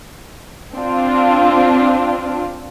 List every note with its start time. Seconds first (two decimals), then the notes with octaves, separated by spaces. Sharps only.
0.74 C4 D4 F4